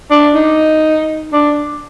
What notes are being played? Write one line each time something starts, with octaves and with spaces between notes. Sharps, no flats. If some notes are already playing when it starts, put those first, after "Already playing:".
D4
D#4
D4